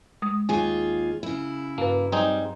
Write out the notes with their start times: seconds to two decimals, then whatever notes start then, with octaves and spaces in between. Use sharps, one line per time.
0.22 G#3 D#6
0.49 D#2 F4 G#4 G#5
1.23 C#3 E4
1.78 G2 A#3 B4
2.12 G3 C4 D#4 G#4